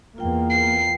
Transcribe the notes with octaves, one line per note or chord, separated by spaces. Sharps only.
E2 A#3 F4 G5
C7